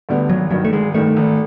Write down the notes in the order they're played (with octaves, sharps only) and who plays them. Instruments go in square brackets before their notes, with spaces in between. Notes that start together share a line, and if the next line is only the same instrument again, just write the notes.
[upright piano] D2 D3 G3 B3
[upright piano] G#1 [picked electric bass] F#3
[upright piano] G2 D#3 [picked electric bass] F#3
[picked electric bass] A3
[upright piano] G#1 [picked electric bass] G#3
[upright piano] G2 D#3 [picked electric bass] A3
[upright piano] G#1